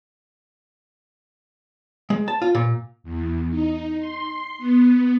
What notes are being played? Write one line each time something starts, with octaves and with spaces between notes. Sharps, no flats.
G#3
A5
F4
A#2
E2
D#4
C6
B3